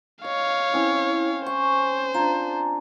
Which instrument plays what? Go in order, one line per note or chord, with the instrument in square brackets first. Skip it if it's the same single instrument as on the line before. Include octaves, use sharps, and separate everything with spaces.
[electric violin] C#5 F5 [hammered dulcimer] D#5
[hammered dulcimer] C4 C#4 B5 [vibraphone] E4
[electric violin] C5 [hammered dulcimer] G#5 [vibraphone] C#6
[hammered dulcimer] D4 F4 [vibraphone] A#5